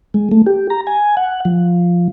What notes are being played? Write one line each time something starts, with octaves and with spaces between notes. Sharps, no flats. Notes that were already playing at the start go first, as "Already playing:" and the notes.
G#3
A3
G4
A#5
G#5
F#5
F3